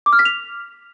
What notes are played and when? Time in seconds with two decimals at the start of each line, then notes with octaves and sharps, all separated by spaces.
0.06 D6
0.13 F6
0.19 B6
0.25 F7